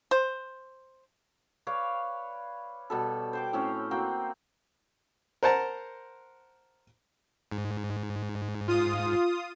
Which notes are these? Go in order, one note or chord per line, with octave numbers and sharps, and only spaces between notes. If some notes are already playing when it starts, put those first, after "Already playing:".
C5
B4 C#5 D5 F5
B2 G3 A4
C5 G5 D6
A2 C4 C#4
A#3 C4 F#4 G5
A#4 C5 F#5 A5 A#5
G#2
F4 D#6